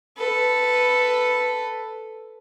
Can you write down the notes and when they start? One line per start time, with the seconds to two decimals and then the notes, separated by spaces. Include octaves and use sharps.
0.17 A4 B4